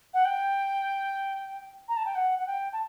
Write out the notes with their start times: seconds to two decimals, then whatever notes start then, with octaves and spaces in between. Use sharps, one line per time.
0.14 F#5
0.25 G5
1.88 A#5
1.97 A5
2.05 G5
2.15 F#5
2.39 F#5
2.47 G5
2.73 A5